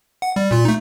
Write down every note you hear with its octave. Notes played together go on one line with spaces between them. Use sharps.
F#5
G3
A#2 F4
A3 D#4